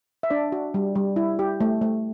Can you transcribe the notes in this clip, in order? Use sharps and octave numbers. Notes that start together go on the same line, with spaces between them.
E5
D4 D5
F#4
G3
G3
E4
G4
A3
A3